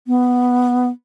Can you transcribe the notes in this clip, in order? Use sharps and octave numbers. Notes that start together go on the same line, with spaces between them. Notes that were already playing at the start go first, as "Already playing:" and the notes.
B3